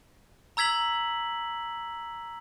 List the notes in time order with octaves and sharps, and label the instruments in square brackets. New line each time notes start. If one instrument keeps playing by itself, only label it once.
[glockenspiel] A#5 E6 G#6 B6 F#7